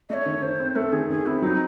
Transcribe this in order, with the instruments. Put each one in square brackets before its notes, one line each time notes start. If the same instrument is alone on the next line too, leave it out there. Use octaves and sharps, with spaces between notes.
[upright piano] A3 [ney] C#5 D#5
[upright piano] D#3
[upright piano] D#3 [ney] C5
[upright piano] C4
[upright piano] A3 [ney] A4
[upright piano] D#3 [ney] G#4
[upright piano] D#3 [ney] G#4
[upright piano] C4 [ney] E4
[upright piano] F#3 [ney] D#4